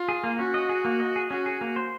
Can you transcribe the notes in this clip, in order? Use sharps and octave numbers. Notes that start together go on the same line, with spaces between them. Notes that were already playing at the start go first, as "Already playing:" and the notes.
Already playing: F4
G#4
A#3
C#4 F#4
D#5
G#4
A#3
D#5
G#4
C#4 F#4
G#4
A#3
C5